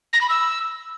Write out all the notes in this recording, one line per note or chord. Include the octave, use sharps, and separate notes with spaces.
A#6
B5
E6